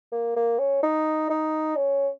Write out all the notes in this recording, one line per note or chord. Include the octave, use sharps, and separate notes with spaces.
A#3
A#3
C#4
D#4
D#4
C#4